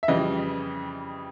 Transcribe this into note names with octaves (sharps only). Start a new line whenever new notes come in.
E5
F2 C#3 E3 G3 D#5